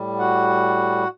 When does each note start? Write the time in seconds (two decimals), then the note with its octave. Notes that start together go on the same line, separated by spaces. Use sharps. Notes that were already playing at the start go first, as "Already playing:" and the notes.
Already playing: A2 G3
0.19 F#4 F#5